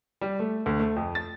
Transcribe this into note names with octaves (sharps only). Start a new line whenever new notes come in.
G3
A3
D2
A3
F2
A6